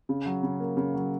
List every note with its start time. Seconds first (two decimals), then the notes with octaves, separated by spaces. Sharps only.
0.09 C#3
0.26 F#3
0.43 C#3
0.60 A#3
0.77 C#3
0.94 F#3